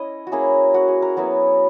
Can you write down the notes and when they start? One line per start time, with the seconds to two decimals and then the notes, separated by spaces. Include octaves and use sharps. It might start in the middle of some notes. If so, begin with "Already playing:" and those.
Already playing: C#4 E4 C#5 D#5
0.27 F#4
0.32 A#3 C#4 E4 G#4
0.74 F#4
0.88 G#4
1.02 A#4
1.17 F#3 B3 E4